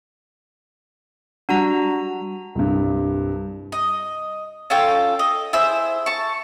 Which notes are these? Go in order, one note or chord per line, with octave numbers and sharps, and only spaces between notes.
G3 D4 F#4 F#5 A#5
C2 G2
D#5
C#4 F4 A4 G5
D#5
E4 G#4 C5 E6
A5 C#6